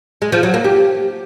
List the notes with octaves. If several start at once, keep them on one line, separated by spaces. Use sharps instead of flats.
G#3
F3
F#3
A#3
G4